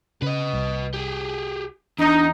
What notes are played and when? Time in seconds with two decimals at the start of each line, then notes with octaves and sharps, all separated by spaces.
0.22 C#3 B4 D#5
0.53 C2
0.94 G4 G#4
1.98 E2 D4 D#4